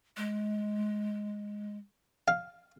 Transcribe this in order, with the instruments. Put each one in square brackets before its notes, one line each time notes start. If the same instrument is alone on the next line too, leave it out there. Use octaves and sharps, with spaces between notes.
[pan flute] G#3
[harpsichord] F5